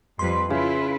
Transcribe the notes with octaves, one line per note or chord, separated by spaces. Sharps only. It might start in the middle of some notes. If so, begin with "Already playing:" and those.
F2 G3 B4 C6
C#3 E4 F4 B4